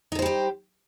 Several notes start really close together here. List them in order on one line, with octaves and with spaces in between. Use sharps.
D#4 A4 C5 G3 G4